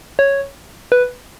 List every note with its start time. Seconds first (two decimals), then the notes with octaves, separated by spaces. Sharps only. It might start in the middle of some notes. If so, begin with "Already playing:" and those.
0.19 C#5
0.92 B4